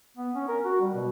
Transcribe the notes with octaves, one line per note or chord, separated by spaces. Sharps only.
B3
C#4
A#4
F#4
G3
B2